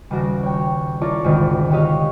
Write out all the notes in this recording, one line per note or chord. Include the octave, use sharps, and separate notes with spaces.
D#1 C#3 F#4 A#6 D7
C#5 G5
E4 F4 A4 A#4 C#5 D5
G#1 D2 C3 D#3
F#4 G4 C#5 D#5 F5